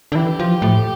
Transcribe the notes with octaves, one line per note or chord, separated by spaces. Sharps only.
D3
E3 G4
F3
A2